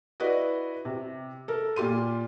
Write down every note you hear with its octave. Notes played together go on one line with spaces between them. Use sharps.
E4 F#4 B4 D5 D#5
C3
A4 A#4
A#2 F4 G4 C6 D#7